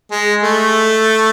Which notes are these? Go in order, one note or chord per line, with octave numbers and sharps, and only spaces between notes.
G#3
A3